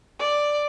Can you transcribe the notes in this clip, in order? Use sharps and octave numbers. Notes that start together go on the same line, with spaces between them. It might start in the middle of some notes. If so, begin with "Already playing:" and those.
D5